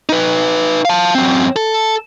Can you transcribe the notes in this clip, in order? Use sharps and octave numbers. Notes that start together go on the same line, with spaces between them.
D#4 B4
F5 A5
F#2 C4
A4